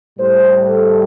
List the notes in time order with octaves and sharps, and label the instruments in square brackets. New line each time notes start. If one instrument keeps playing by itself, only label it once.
[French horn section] A2 G3 C5
A4